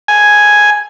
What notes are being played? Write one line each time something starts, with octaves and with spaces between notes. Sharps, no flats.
G#5